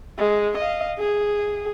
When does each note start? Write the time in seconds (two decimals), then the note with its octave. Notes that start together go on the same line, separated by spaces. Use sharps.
0.19 G#3
0.58 D#5 F5
0.99 G#4